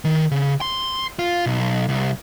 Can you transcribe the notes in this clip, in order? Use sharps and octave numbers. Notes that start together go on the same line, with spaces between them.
D#3
C#3
C6
F4
B1
C2